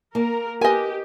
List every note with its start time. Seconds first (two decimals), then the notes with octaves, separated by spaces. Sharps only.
0.15 A#3 A#4
0.61 G4 A#4 B4 D#5 G#5